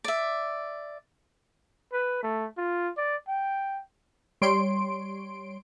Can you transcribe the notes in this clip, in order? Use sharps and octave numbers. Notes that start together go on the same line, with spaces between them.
D5 E5
B4
A3
F4
D5
G5
G3 C#5 C6 D7